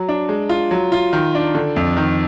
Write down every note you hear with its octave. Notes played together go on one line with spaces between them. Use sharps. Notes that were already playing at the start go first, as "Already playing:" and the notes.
Already playing: F#3
D4
G#3
F4
F#3
F4
D#3
D4
D3
F2
D#3